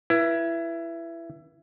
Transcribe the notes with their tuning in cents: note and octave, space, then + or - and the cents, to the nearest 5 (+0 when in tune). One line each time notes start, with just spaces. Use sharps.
E4 +20 B4 -30